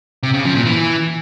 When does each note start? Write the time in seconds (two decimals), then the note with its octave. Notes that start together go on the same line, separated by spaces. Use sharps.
0.23 C3
0.34 C#3
0.44 F3
0.55 A#2
0.66 E3